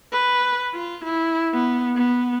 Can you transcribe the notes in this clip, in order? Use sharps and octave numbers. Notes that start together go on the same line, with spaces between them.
B4
F4
E4
B3
B3